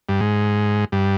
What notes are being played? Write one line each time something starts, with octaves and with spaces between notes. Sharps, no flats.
G2
G#2
G2